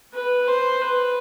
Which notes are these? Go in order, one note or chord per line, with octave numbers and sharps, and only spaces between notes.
B4
C5
B4